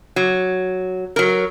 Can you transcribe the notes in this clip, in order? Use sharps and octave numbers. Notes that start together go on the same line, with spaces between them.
F#3
F#3 A#4